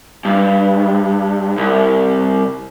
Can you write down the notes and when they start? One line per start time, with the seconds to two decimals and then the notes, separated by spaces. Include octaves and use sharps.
0.25 G2
1.57 C2